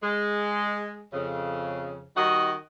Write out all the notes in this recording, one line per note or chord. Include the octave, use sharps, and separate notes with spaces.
G#3
F2 C#3
D#3 G3 D#4 F#4 D#5